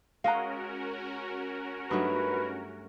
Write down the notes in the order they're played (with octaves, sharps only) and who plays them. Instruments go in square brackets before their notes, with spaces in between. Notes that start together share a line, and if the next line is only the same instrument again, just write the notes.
[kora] G#3 D#5 F#5 [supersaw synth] C#4 F#4 A#4 [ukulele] F5 A#5
[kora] G2 F#3 A3 [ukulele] D#4 [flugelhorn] B4